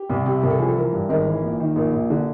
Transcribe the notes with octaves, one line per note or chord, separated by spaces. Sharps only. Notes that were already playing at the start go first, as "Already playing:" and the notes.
Already playing: G4
C2
C3
C2 A#4
A4
F3 G#4
A4
E3 A#4
G2
G#1 A#4
E3
A#1
D#3
A#1 A#4
A#1
D3